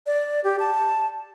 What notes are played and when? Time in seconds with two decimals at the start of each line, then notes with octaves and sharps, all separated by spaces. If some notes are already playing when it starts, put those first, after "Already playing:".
0.06 D5
0.44 G4
0.59 A5